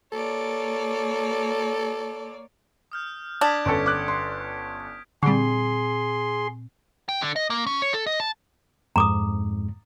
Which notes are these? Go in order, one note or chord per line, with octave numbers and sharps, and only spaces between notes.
A#3 A4 C#5 D5
D#6 F6 G6
D4 D#6 G#6 B6
G1 C#4 A4 D7
D6 F#6
C6
A#2 D3 G3 C4 G#4 C6
G5
D3
D#5
A#3
C#4
C#5
A4
D#5
A5
F2 G#2 G#3 A#5 D6 D#6